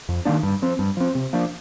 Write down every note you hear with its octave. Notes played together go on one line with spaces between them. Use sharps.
F2
D#3 A#3 D4
G2
F3 C4
G2
F3 C4
C3
F3 A#3 D4